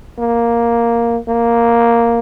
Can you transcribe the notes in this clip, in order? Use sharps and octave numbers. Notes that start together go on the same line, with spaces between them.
A#3
A#3